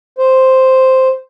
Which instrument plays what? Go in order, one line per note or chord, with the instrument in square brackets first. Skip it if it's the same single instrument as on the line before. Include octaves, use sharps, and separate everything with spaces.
[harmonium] C5